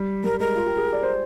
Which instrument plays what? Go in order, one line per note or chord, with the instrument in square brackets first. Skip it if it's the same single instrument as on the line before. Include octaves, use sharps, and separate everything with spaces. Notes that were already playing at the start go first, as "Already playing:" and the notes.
Already playing: [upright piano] G3
[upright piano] G3 [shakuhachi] A#4
[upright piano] G#3 [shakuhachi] A#4
[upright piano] F4
G4
G#4
D5
C5